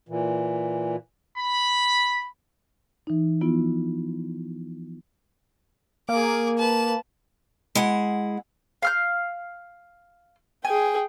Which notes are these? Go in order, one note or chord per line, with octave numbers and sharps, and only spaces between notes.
A#2 E3
B5
E3 D#4
E3 F3 B3 E4 F4
A#3 G#4 D6
B4 A5
G#3 E4 F#5
F5 F6 G6
G#4 G5 G#5